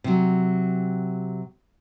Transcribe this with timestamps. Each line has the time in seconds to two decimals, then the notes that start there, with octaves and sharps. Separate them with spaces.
0.04 C3 F#3